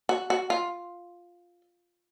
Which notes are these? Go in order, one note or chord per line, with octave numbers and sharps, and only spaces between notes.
F#4
F#4
F4